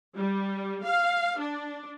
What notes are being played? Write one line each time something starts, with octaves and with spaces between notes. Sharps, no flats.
G3
F5
D4